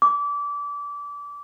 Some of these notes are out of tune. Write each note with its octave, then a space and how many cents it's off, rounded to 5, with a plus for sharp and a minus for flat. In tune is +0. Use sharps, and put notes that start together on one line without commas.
D6 -25